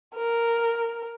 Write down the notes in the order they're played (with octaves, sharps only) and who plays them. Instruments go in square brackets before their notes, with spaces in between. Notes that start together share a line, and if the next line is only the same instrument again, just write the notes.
[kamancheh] A#4